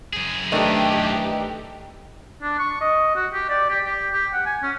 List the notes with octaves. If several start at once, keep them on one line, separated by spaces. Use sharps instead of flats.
F#2 G#4
D#3 E3 A3 D4 D#4 G4
D4
C#6
D#5
F#4
G4
D5
G4
G4
G4
F#5
G#5
C#4